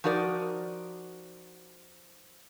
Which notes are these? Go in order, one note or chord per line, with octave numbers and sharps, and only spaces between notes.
F3 D#4 F#4 A#4 D5